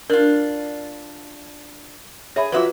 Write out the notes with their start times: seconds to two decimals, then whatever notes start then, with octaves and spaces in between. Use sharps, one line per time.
0.10 D4 F4 A#4
2.36 G#4 C#5 E5 B5
2.52 F3 F#3 F4 F#4 B4 E5